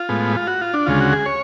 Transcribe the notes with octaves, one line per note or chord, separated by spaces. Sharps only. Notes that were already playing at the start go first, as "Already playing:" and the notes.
Already playing: F4
A2 G#3 B3
F4
F#4
F4
D4
D2 C#3 G#3 F4
F#4
G#4
C#5